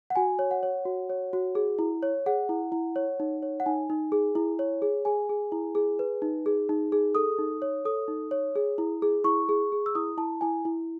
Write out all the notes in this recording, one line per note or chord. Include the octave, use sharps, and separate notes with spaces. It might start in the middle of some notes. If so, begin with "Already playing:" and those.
F#5
F#4 G#5
C#5
F#5
C#5
F#4
C#5
F#4
G#4
E4
C#5
G#4 F#5
E4
E4
C#5
D#4
C#5
F#5
D#4 G#5
D#4
G#4
E4
C#5
G#4
G#4 G#5
G#4
E4
G#4
B4
D#4
G#4
D#4
G#4
A4 D#6
D#4
C#5
A4 D#6
D#4
C#5
G#4
E4
G#4
E4 C#6
G#4
G#4
E6
E4 D#6
E4 A5
E4 G#5
E4